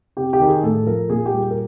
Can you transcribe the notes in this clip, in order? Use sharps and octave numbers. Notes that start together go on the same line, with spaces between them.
C3 G4
G4
D#3
G#4
A2 A4
F3 A#4
A#2 G#4
G4
G3
G#4
A#4